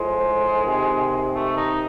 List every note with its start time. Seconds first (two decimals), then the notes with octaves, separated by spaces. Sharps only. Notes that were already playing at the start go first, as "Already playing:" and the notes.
Already playing: A2 F3 G#3
0.64 C3 D#3
1.34 A3
1.57 D#4